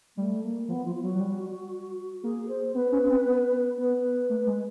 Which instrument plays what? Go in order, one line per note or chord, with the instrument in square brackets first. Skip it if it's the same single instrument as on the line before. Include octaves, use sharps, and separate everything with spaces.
[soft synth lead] G3 [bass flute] A3
[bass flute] A#3
[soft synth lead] F3 [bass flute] B3
[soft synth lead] F3 [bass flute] F4
[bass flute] F4
[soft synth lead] F#3 [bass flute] F#4
[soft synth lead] F#3
G3
[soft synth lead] A#3 [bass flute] G#4
[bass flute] C5
[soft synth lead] B3 [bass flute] B4
[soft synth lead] C#4
C4
B3
[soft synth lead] B3 [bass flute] B4
[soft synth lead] A3
G#3